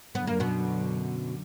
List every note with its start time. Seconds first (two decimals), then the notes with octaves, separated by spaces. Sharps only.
0.15 F#2 D3 F#3 B3
0.27 A#3
0.40 B2 B3